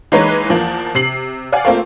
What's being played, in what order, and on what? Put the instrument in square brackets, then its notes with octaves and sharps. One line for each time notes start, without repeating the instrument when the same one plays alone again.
[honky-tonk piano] E3 G#3 A#3 D#4 B4 C#5
E2 F3 A#3
C3 C7 F#7
D5 F5 F#5 G#5
A3 A#3 C4 F4